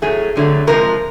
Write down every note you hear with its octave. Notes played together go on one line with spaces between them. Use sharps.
A2 F#3 A3 G#4
F2 D3 F#3 A3
C3 F3 G#3 A#4